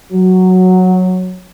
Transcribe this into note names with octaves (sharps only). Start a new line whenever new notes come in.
F#3